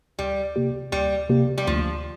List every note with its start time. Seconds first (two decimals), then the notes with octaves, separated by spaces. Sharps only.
0.19 D2 G3
0.56 C3 A#3 G4
0.92 D2 G3
1.29 C3 A#3 G4
1.58 G3
1.67 D2 F3